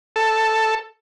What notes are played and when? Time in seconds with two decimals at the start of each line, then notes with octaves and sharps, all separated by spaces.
0.16 A4